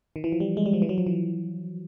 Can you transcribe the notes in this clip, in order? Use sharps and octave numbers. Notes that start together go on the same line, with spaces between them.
D#3
E3
F3
G3
G#3
G3
F3
E3
F#3
F3
E3